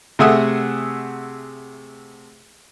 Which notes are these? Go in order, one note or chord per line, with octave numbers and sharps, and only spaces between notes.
C3 A3 G#4 E5 F#5 D#6